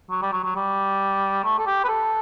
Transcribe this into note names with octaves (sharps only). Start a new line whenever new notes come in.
F#3
G3
F#3
F#3
G3
A3
A4
G4
B4
A4